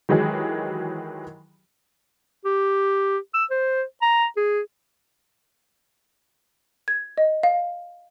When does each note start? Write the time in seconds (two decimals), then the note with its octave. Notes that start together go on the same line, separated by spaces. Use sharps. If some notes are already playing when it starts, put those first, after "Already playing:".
0.09 D#3 E3 F#3 G#3 G4 G#4
2.45 G4
3.34 E6
3.51 C5
4.02 A#5
4.37 G#4
6.88 G#6
7.18 D#5
7.43 F5